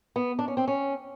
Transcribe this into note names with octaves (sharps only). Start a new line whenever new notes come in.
B3
D4
C#4
C4
C#4